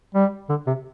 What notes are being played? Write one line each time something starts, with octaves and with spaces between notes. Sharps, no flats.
G3
D3
C3